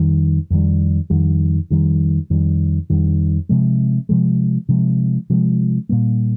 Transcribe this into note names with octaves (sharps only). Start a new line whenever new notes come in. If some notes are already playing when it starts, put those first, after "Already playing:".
Already playing: F2 D#3 G3
F2 D#3 G3
F2 D#3 G3
F2 D#3 G3
F2 D#3 G3
F2 D#3 G3
C3 F3 G#3
C3 F3 G#3
C3 F3 G#3
C3 F3 G#3
A#2 G3 A#3